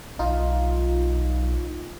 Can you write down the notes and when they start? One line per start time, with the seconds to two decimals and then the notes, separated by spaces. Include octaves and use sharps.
0.19 B1 D#4 F4